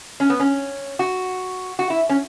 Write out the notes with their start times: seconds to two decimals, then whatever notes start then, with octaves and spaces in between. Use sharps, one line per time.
0.20 C#4
0.30 B3
0.40 C#4
0.99 F#4
1.79 F#4
1.90 E4
2.09 C#4